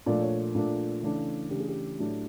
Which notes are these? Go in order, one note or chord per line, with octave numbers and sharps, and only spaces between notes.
A#2 F3 A3 D4 D5
C#5
A#2 F3 A3 D4
C#3 E3 A3 D4
C#3 E3 A3 D4 G4
G#4
G4
A2 F#3 A3 D4